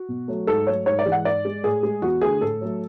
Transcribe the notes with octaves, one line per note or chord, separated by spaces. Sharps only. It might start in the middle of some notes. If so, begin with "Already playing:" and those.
Already playing: F#4
B2
F#3 A3
G#2 A4
F#3 A3 C#5
G#2 C#5
D5
E3 G#3
F#5
G#2 D5
G#3
A2 G#4
G#3
E2 F#4
D3 A3 G#4
A2 A4
F#3 A3